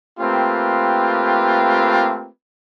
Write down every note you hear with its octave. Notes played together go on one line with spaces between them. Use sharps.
A3 A#3 C4 F4 G4 B4